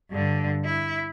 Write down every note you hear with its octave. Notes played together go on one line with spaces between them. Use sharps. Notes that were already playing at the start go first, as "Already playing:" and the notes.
G2 D3
E4